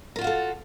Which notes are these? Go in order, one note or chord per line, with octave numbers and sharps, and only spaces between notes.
F4 F#4 A4 A#4 F5